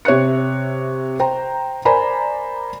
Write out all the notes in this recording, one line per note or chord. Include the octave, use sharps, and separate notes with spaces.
C3 C#5 E5 F#6 C#7
C5 G5 A#5
A#4 C5 D5 G#5 A#5 B5